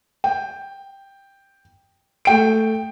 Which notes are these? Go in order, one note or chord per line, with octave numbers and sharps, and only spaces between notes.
G5
A3 G5 D7